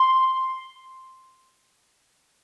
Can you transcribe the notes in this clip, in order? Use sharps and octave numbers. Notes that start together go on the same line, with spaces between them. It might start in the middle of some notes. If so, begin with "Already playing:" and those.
Already playing: C6